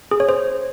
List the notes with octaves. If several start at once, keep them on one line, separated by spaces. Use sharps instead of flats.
G#4
C#5
C5